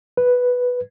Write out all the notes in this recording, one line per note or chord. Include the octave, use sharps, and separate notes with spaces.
B4